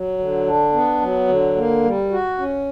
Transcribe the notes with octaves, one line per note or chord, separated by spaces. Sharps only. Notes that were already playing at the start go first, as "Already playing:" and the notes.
Already playing: F#3
D3
D4
B3
F#3
D3
A#3
G3
F#4
C#4